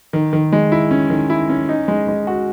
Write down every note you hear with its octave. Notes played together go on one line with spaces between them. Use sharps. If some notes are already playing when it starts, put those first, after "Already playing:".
D#3
D#3
G#3
E4
C#4
D#3
E4
C#4
D#4
G#3
G#3
F#4